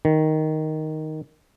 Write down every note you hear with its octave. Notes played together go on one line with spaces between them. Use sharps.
D#3